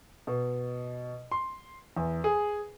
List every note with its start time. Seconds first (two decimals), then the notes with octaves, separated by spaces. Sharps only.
0.27 B2
1.32 C6
1.97 E2
2.24 G#4